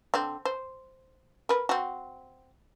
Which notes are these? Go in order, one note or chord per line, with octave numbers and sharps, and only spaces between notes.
D3 C4
C5
A#4 B4
C4 F#4